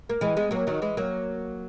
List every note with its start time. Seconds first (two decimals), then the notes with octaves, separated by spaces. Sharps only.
0.09 A#3
0.21 E3 G#3
0.37 G#3 B3
0.51 F#3 A#3
0.67 D#3 F#3
0.82 E3 G#3
0.97 F#3 A#3